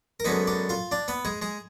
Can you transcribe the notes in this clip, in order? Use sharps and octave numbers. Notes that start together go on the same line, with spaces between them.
A#4
F#2 D3 G#3 B3 D#4 B4
D4 D5
F4 F5
D4 D5
B3 B4
G#3 G#4
G#3 G#4